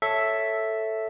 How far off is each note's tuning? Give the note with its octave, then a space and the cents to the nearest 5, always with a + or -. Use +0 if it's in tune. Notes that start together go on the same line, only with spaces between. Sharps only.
A4 +0 C#5 +0 E5 +0